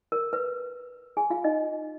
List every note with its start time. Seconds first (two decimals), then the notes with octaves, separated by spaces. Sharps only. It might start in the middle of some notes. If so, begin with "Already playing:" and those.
0.12 A#4
0.33 B4
1.17 G#4 G#5
1.30 F4 F5
1.44 D#4 D#5